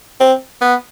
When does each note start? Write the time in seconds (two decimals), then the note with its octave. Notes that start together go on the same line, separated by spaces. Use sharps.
0.20 C4
0.61 B3